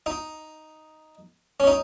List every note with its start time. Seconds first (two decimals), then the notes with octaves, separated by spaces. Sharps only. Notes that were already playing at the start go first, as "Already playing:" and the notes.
0.06 D#4
1.60 C#4
1.67 D#4